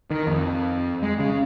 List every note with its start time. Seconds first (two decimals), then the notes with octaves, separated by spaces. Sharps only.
0.11 D#3
0.27 F2
1.02 G#3
1.19 C#3